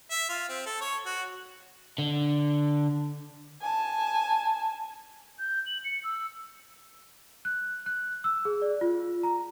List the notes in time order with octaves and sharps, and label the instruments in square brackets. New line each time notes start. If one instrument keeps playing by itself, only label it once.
[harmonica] E5
F4
C4
A4
C#5
F#4
[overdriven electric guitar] D3
[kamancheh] G#5 A5
[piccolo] G6
F#7
C#7
E6
[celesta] F#6
F#6
E6
G#4
D5
F4
A#5